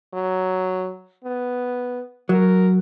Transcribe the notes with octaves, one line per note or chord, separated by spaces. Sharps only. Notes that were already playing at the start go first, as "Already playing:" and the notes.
F#3
B3
F#3 A#4